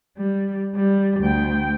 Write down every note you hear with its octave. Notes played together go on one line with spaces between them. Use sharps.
G3
G3
D2 G5